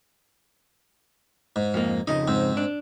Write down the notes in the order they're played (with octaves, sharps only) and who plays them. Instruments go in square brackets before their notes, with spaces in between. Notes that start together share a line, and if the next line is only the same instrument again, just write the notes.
[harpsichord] G#2
[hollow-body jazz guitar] F2 A#3
[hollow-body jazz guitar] F2 C#3 D#4 [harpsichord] D#5
[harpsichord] G#2 C4
[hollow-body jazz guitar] D4